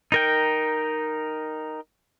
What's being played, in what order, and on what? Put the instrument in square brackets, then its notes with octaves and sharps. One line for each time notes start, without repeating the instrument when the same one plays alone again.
[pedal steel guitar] D#4 A#4 G5